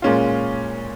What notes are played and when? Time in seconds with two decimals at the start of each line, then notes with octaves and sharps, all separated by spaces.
0.02 A#2 G#3 C#4 F4